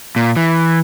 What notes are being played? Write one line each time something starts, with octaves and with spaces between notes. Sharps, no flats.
A#2
E3